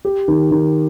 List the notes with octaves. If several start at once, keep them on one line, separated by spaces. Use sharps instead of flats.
G4
D#3
D#3